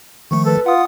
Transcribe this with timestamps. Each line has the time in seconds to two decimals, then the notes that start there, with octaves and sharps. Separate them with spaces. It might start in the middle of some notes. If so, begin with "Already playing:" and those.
0.31 D#3 F3 A3 C#6
0.45 A4 B4
0.66 F4 F#5 D#6